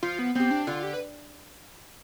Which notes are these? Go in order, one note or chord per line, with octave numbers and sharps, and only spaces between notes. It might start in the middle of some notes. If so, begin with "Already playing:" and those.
F3 F4
B3
B3 C4 G4
D4
D3 F4
G4
B4